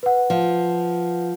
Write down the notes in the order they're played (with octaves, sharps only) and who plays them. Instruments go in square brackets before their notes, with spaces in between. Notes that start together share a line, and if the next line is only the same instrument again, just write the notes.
[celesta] B4 F#5
[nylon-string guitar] F3